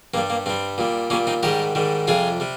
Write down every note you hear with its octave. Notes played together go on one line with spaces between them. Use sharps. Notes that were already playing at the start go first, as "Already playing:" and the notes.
G2 G3 A#3
A#3
G2 G3 C4
A#2 G3
A#2 G3 A#3 C#4
C4 D#4
G#2 D#3 G3 G4 A#4
G#2 D#3 G3
F2 C3 G3 F4 G#4
C3 G3